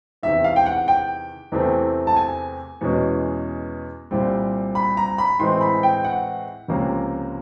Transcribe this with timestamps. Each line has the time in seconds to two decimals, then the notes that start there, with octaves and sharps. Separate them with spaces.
0.23 E2 C3 D#3 E5
0.44 F5
0.56 G5
0.66 F#5
0.88 G5
1.52 E2 C3 E3 A3 C4
2.07 A5
2.17 G#5
2.81 E2 B2 G#3 C#4
4.11 C2 A#2 G3 C4
4.75 B5
4.97 A#5
5.18 B5
5.39 A2 E3 G#3 C4 C6
5.61 B5
5.83 G5
6.04 F#5
6.68 C#2 C3 F3 A#3 C#4